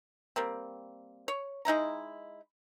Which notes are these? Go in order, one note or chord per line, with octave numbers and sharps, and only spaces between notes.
G3 A#3 C4
C#5
G#3 D#4 E4 A#5